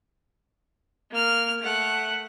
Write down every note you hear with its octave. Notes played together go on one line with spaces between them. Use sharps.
A#3 F6
A3 F#5